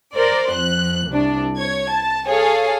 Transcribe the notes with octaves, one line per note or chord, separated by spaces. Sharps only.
A#4 C5 D5
F2 F#6
C2 D4
C#5 G#6
A5
G#4 A4 C#5 F5